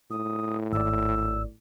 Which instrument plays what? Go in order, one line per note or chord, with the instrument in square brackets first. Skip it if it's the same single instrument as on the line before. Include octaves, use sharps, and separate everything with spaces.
[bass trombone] A2 [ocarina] D#6
[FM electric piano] G#1 D5 [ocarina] E6